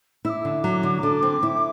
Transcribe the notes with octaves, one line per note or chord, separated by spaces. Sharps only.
E4 D6 E6
D3
F#3
D3
D3
C4
E4